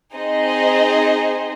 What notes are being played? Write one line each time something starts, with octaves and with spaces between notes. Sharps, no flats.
C4 D#4 G#4 C5 D#5